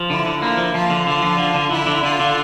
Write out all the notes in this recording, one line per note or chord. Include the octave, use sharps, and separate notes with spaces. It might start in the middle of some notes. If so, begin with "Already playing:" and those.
Already playing: F3
D3 E4
D3
A#3 E4
F3
F3 F4
D3
D3 F4
F3
D3
D3
D3 E4
D3
D3 F4
D3